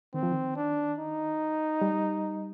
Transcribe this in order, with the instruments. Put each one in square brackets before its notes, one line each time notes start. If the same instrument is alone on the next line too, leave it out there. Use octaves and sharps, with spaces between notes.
[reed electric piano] D#3 [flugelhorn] C4
[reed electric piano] F3
D#3
[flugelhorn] D4
D#4
[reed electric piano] G3